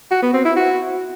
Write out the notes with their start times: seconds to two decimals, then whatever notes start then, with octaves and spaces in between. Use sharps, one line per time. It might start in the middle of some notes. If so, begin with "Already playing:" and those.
0.11 F#4
0.22 B3
0.33 C4
0.45 E4
0.56 F#4